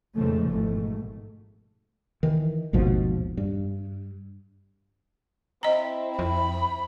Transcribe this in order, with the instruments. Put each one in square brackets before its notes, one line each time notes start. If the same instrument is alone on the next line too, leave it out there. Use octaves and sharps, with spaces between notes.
[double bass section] F2 G#2 C#3 E3 F3 A3
G#1 G#2 B2 A3
[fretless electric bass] D#3 E3
G#1 D#2 B2 F3
G2
[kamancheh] C4 E4 [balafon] D#5 A#5
[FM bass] F2 [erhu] B5